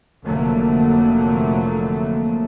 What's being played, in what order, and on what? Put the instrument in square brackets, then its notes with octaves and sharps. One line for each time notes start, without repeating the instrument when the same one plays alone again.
[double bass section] F1 F2 D3 F#3 A3 A#3